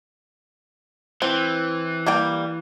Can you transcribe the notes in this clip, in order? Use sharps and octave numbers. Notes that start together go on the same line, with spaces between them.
E3 C4
G3 A#3 G5